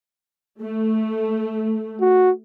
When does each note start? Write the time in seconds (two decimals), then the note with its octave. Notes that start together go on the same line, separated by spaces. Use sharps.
0.61 A3
2.01 F#4